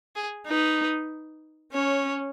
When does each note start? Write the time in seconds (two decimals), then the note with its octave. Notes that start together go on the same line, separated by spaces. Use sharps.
0.16 G#4
0.47 D#4 B4
1.73 C#4 C#5